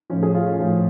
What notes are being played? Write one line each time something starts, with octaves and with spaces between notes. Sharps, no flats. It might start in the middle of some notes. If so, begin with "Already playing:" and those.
A2 F3 C#4
G#4
F4
C#4
A2 F3